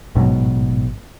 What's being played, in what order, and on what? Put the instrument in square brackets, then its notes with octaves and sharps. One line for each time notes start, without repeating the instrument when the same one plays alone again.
[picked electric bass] A1 G#2 B2 F#3